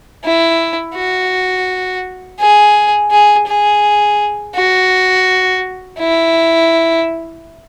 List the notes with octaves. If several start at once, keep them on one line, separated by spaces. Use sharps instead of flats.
E4
F#4
G#4
G#4
G#4
F#4
E4